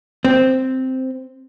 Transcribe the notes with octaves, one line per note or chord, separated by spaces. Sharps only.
C4